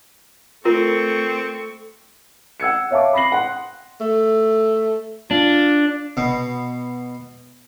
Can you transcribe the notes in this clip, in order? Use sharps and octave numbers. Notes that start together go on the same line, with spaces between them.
A3 C4 F4 A#4 C#6
F#5 E6 G#6 C#7
C#5 E5 F5 A5 C#6 D6
B5 D#6 A#6 C7 F#7
F#5 C6
A3
D4 F4
B2